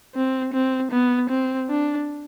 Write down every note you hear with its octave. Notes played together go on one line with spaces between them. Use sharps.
C4
C4
B3
C4
D4